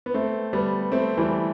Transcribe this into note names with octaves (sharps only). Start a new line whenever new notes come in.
B3
A3 C4
G3 B3
A3 C4
E3 G3